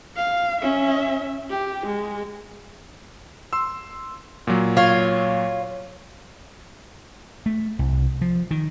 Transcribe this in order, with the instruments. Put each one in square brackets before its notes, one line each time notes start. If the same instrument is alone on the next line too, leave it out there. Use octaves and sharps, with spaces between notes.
[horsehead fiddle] F5
C#4 E5
G4
G#3
[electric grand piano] C6 E6
A#2 F#3
[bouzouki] F4 C#5
[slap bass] A3
C2
F3
D#3